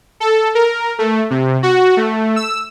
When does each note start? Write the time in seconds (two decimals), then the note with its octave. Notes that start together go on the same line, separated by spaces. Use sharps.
0.20 A4
0.55 A#4
0.99 A3
1.30 C3
1.63 F#4
1.97 A3
2.36 E6